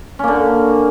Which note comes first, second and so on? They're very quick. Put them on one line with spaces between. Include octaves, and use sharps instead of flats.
C#4 A#3 D3